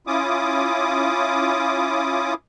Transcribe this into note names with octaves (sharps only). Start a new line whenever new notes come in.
C#4 E4 F4 D6 D#6